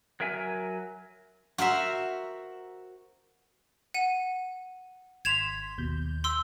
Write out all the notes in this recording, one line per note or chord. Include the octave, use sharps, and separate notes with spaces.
F#3 A#4 E5 G#5
F#4 A#4 C5 E5
F#5 D#7
G#1 C6 G#6 B6 E7 F7
D#2 B2 G6
C6 E6